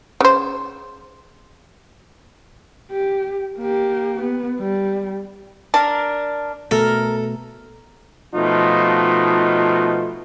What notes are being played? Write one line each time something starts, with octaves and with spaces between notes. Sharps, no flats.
C#3 C5
G4
A#3 G4
B3
G3
D4 A#4 A5
B2 A3 A4 A#4
B2 F3 A3 D#4 F4